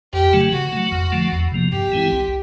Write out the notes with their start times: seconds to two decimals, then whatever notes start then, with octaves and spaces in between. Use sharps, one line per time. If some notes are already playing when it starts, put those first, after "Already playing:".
0.13 F2 G4
0.33 C#3 F#3 A3
0.53 C#3 F#4
0.73 F#3 A3
0.92 F2
1.12 D3 F3 A3
1.32 E2
1.52 C3 F3 A#3
1.72 G2 G4
1.92 E3 G#3 C4 E4
2.12 C2